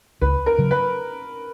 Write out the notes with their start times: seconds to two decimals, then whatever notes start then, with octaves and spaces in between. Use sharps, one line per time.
0.21 C#2 B4
0.46 A#4
0.58 C#3 F#3
0.71 B4